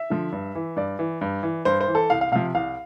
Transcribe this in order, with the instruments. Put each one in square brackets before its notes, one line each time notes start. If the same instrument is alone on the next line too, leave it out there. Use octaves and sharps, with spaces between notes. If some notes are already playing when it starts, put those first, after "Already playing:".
Already playing: [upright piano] E5
D3 F3
G2
E3
G2 D5
E3
G2
E3
G2 C5
C5
E3
A4
C2 F5
F5
C3 F3 F5
C2 F5